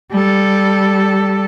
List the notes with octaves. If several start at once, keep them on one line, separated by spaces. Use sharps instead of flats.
G3 A4